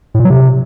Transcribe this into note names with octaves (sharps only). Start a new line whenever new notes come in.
A2
A#2
F#3
C3